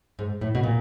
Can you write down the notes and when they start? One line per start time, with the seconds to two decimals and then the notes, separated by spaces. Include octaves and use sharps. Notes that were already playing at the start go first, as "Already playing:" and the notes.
0.19 G#2
0.41 A2
0.55 B2
0.63 A#2